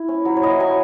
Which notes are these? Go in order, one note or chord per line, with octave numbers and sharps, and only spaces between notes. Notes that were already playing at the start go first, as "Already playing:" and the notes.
Already playing: E4
C#4
F#3
C#5
E4 D#5
F#3 G#5